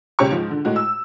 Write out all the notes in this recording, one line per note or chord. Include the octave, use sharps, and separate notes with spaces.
C#2 C#4 G4 C#6
G#2 F3
D3
A2 G#3 F#4
E6